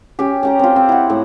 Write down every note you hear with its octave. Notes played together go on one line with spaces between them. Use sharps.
C#4 G4
C#4 G5 A#5
C4 F4
C4
E4 F#5
A2